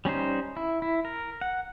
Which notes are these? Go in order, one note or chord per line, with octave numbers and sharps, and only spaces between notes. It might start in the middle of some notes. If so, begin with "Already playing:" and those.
G3 C#4 D#4 C5
E4
E4
A#4
F#5